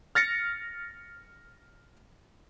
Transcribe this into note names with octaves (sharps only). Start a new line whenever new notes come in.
F6 A6 A#6 C#7